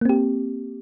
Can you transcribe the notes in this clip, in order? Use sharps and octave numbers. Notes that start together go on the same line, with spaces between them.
A#3 C4 G4